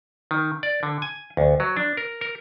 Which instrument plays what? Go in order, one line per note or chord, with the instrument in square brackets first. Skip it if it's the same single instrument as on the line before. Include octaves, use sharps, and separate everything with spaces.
[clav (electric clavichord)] D#3
D5
D3
G#5
D2
F#3
D4
A#4
A#4